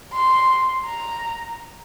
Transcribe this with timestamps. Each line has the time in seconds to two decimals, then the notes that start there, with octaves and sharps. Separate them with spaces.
0.13 C6
0.86 A#5